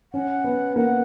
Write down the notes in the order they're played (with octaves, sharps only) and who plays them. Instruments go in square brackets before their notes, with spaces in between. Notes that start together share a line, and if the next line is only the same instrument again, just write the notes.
[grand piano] C#4 [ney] F#5
[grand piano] B3
[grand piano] A#3 [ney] F#5